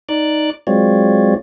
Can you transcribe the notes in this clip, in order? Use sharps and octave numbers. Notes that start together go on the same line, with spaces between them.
D#4 D5 D6 F#6
F#3 G#3 C4 F4 C#5 D5